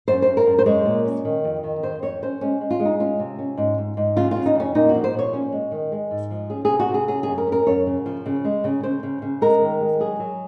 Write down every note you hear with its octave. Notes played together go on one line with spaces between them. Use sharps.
F#2 C5
C5
F#2
A#4
F#2
C5
G#3 C#5
A#2
C#4
D#3
F2
D#3
F2 C5
F2 C#5
C#4 C5
G#3 C#4
G#3
F4
G#3
D#4
C#4 F4
C3
C#4
G#2
G#2
G#2
C#3 F4
F4
C#3
D#4
F2 C#4
A#2 D#4
F#4
F3
C5
A#2 C#5
C#4
G#3
D#3
G#3
G#2
F3
C#4 G#4
G#4
C3
F#4
C3 G#4
C#4 G#4
F#2 G#4
A#4
C#4
A#4
F#2 C#5
C#3
F3
C#3
G#3
C#3
C#3 C5
C#3
C#3
G#3 A#4
D#3
G#3
F#3 G#4
F#3